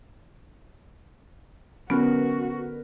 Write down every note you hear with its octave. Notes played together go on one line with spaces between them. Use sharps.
D3 F#3 B3 C#4 F#4 A#4 B4